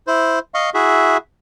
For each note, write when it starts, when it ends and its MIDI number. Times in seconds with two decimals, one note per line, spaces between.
0.07 0.39 64
0.07 0.39 72
0.54 0.70 75
0.54 0.70 77
0.54 0.70 85
0.74 1.17 64
0.74 1.17 66
0.74 1.17 68
0.74 1.17 76